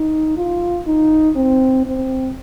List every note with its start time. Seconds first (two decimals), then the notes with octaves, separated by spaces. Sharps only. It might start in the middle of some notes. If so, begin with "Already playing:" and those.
Already playing: D#4
0.37 F4
0.87 D#4
1.36 C4
1.86 C4